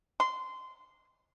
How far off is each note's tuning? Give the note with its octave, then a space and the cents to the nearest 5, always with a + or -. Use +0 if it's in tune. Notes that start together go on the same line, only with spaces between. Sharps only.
C6 -20